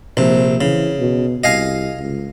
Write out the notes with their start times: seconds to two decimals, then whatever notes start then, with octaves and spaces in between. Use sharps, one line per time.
0.17 A#1 C3
0.61 C#3 E3
1.00 B2
1.44 C2 D#5 F5 G#5
1.98 C#2